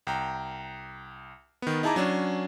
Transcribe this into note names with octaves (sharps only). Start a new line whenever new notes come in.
C2 G5 A#5
D#3 B3
D#4 E4 G#4 A5 A#5 D6
F#3 C#4 D4